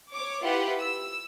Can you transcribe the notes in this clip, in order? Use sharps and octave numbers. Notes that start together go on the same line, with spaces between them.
C#5 D6
E4 F4 G4 B4 F#5
E6